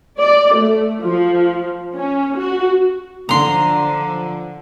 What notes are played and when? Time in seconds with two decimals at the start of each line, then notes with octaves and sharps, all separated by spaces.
0.20 D5
0.56 A3
1.03 F3
1.95 C#4
2.39 F#4
3.29 D3 F3 A#5 C6